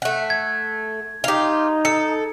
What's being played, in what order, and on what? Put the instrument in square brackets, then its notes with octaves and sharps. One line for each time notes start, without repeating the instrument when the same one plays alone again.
[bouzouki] A3 F#5
[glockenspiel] G#6
[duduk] D#4 [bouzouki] F4 G4
[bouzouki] A4 [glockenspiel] C#7